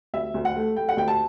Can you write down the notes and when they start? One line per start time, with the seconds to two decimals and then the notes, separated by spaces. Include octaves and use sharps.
0.14 D2 E5
0.34 D2
0.45 F#5
0.56 A3
0.76 A3 G5
0.89 F#5
0.97 D2 G5
1.08 A5